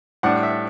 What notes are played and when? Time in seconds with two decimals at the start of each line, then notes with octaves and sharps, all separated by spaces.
0.23 A2 G3 D4 F#5
0.43 E5